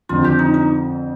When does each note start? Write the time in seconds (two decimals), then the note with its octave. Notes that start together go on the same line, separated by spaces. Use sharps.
0.09 F2 D3 F3 C4 F4
0.24 G4
0.39 D#4
0.54 D#4